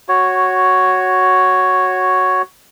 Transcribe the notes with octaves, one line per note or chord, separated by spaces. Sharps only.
F#4 C#5